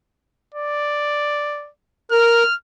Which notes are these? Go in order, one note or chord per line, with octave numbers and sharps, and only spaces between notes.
D5
A#4 F6